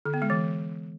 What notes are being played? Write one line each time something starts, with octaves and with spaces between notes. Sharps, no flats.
D3
B3
G#3
E3